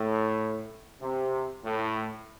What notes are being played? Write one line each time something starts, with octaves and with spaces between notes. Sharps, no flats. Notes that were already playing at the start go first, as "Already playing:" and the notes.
Already playing: A2
C3
A2